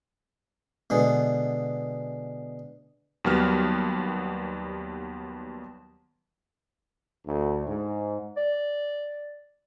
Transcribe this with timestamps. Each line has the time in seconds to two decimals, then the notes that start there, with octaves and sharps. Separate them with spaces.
0.90 B2 D3 G#3
3.24 D#2 F#3 G3 B3 F6
7.26 D2
7.66 G#2
8.37 D5